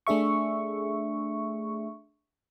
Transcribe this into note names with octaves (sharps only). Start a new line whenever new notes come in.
A3 D4 G#4 E5 C#6